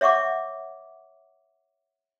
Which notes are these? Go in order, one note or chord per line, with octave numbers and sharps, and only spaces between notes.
C#5 E5 F#5 C#6 D6